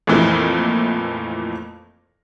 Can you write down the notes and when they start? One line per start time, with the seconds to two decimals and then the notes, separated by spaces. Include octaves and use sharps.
0.07 F2 A#2 E3 A3 A#3